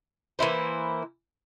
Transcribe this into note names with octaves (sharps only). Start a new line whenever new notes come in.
E3 A#3 E4 C5